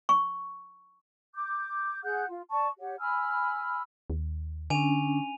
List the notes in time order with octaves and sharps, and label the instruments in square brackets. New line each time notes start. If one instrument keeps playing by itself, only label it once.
[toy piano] C#6
[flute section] D6 G6
G#4 F#5 F#6 G6
F4
D5 A5 C#6
G4 C#5 F#5
G#5 B5 E6 F6
[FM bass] D#2
[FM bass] D3 [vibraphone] C#4 D4 [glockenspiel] G#5 D#7 F7